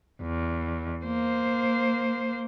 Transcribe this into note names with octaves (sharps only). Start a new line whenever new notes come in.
E2
A#3 C5